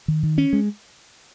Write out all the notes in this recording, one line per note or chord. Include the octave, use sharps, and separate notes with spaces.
D#3
D#3
C#4
G#3